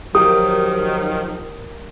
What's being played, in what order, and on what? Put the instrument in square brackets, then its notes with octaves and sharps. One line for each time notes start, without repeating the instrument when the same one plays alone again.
[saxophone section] D#3 F3 [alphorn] F#3 [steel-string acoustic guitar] G4 A#4 [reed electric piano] D#6